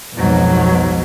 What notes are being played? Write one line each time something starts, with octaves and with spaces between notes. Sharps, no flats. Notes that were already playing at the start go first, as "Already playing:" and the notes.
B1 F2 G#2 B2 F#3